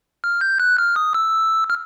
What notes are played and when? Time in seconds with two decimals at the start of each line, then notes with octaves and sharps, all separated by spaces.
0.24 F6
0.41 G6
0.60 F#6
0.78 F6
0.96 D#6
1.14 E6
1.70 F6